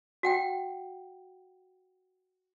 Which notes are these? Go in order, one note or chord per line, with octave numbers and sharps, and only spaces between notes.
F#4 F#5 G5